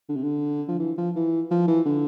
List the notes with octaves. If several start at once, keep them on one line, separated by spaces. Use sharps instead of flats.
D3
C3
D3
F3
E3
F3
E3
F3
E3
D3